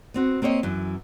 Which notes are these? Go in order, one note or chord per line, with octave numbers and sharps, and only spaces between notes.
B3 C4 F#4
A#3 C4 G4 C#5 D#5
F#2 E3